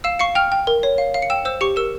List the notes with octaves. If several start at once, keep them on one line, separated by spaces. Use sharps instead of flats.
F5 E6 E7
F5 C#6 C#7
G5 F6 F7
G5
A#4
C#5
F5
F5
C#7
G5 E6 E7
C5 E6 E7
G4 C#6 C#7
A#4 E6 E7